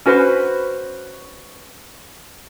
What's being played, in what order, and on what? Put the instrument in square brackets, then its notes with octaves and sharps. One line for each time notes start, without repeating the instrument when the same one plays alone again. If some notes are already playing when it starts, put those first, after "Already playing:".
[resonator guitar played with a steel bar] C#4 F#4 B4 C5